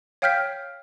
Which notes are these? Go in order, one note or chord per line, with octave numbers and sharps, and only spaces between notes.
C#5 F5 G5 F6 G6 B6